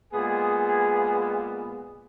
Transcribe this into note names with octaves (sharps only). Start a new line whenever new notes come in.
A#2 G#3 B3 G#4
G#4